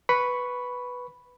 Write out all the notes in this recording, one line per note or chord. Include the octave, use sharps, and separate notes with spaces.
B4 B5 C#6